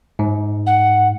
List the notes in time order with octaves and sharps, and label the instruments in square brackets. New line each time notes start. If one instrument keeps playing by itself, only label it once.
[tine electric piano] G#2
[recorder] F#5